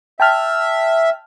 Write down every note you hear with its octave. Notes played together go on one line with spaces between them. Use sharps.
E5 G5 A5 F6